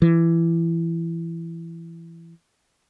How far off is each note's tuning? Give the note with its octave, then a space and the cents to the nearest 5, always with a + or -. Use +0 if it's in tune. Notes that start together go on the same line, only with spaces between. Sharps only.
E3 +20